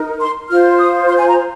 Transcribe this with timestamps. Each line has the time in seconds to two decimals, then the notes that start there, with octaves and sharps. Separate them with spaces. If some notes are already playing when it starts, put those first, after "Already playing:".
Already playing: D#4 A#4
0.21 C6
0.49 F4 C5 F6
0.79 D#6
1.08 C6
1.18 G#5
1.27 A#5